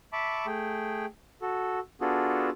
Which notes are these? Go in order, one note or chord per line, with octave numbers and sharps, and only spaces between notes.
E5 A5 B5 C#6 D6
A3 G#4 G5
F#4 A4
B3 D4 F4 F#4 G#4 A4